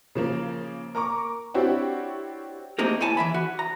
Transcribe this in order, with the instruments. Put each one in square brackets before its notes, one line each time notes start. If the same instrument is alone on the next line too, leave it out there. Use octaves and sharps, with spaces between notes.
[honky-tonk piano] C#3 F3 A#3
A#4 A#5 C#6 D6
C4 D4 E4 F#4 G4 C#5
[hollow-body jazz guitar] A3 A#3 C4 D#4 G4 A#4
E4 C#5 G#5 A5
E3 E5 B5
F#4
A#5